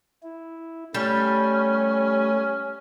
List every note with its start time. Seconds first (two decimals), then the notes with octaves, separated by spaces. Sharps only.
0.23 E4
0.94 G3 A3 C#4